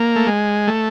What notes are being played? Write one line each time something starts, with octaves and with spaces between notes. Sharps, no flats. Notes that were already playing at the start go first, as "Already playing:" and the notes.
Already playing: A#3
A3
G#3
A3